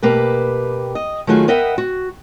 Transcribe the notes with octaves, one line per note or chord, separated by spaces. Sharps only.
B2 A#3 G4 B4
D#5
D#3 F#3 A3 F4 F#4 G#4
B3 A#4 D#5 E5 F#5 G5
F#4